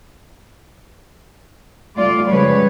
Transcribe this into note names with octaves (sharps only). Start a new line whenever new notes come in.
G3 A3 F4 D5
C#3 F3 G3 G#3 B4 C#5